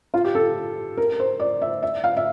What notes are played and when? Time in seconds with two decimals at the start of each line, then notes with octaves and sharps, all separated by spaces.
0.14 F4
0.24 G4
0.35 A4
0.97 A#4
1.20 C5
1.40 D5
1.62 E5
1.83 E5
2.04 F5
2.17 E5